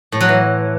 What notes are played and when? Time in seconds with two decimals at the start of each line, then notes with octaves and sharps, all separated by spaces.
0.12 A2
0.21 F#3
0.29 E3